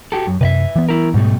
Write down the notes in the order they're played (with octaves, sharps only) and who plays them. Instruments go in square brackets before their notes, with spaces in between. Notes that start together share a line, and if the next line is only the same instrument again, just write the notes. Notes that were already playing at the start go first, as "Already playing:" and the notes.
[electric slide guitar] F#4 G4 A4
F#2
[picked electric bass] F#2 C3 [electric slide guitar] B4 D#5 E5
[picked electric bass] E3 B3
[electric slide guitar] E4 A#4
[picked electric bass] G#2 [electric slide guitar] B2 G3 A3